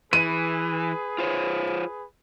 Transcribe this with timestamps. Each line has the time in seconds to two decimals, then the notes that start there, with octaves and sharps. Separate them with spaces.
0.13 E3 G#4 B4 D#7
1.18 F4 C5 C#5